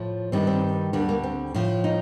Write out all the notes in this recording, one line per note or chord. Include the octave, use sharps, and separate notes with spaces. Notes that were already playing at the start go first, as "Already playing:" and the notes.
Already playing: A2 F3
G2 D#3 G3 C4
C4
D2 D3 G3 A#3
A#3
C4
A2 F3
D#4